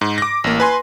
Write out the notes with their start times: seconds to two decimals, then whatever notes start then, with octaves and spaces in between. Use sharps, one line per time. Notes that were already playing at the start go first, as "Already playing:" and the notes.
0.01 G#2
0.18 D6 A#6
0.44 A1 A#3
0.60 B4 G#5 C6